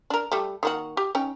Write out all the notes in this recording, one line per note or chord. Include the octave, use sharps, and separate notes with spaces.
D4 A#4
G3 A3
D#3 A#3 F#4
G4
C#4 D#4 G5